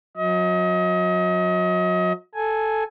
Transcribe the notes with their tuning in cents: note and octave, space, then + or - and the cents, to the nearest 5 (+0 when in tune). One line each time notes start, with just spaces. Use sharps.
F#3 -35 D#5 +35
A4 +0 G#5 +5